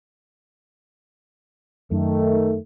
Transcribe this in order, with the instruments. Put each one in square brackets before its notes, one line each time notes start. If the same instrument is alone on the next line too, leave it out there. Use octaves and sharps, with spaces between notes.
[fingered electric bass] F#2 [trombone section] D#3 A3